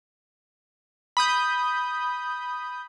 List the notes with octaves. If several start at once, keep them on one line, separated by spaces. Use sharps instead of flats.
B5 D#6 G6